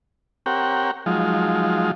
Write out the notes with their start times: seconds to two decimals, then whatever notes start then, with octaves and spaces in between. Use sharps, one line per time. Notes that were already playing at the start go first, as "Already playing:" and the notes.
0.46 C4 G4 A#4 C#5 F#5 G5
1.06 F3 F#3 G#3 D#4 F4